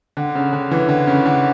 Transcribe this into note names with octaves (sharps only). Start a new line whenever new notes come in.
D3
C#3
D3
E3
D3
C#3
D3